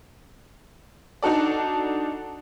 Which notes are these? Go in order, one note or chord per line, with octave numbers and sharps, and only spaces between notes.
D4 D#4 F#4 A4 D5